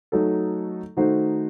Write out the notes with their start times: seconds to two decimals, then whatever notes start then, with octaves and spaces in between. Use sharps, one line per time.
0.12 F#3 A3 D#4 A4
0.97 D#3 A3 D#4 F#4 C5